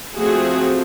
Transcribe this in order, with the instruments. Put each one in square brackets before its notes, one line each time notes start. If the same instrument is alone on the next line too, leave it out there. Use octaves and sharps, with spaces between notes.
[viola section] F3 A3 C4 F#4 G#4